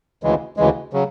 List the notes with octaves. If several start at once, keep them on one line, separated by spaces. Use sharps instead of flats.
D2 C#3 E3 G#3
D2 C#3 E3 G#3
C#3 F#3